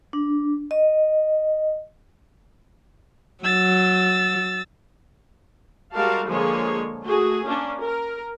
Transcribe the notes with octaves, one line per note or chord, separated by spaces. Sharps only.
D4
D#5
F#3 E6 A6
G3 G#3 F#4 A#4 F5 A5
D3 F3 G#3 A#3 G#4 C#5
A3 F#4 G#4
A#3 C#4 D4
A#4